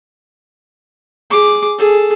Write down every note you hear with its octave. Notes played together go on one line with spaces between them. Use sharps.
G#4 D6
G#4 A4